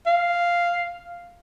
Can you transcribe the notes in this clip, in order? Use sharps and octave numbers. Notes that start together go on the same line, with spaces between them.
F5